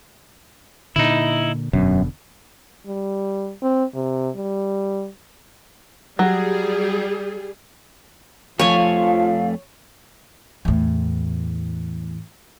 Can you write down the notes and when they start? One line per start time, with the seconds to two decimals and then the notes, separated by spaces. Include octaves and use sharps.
0.96 A#2 D3 D#4 E4
1.73 E1 F#2 B2 D3
2.87 G3
3.62 C4
3.94 C3
4.35 G3
6.19 F#3 G3 G#4
8.59 F2 F3 A3 F4 C#5 F5 G#5
10.65 E2 A2